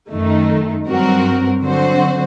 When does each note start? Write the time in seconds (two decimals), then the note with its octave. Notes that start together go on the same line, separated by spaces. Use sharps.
0.11 F#2 D#3 A3 D#4
0.86 G2 F#3 C4 F#4 A#4
1.62 D3 F#3 C4 F#4 C5